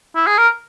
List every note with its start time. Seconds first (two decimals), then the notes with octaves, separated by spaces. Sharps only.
0.16 E4
0.27 G#4
0.38 A#4